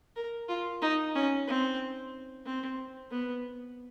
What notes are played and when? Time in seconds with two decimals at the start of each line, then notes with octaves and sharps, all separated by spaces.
0.16 A#4
0.48 F4
0.82 D#4
1.15 C#4
1.47 C4
2.46 C4
3.11 B3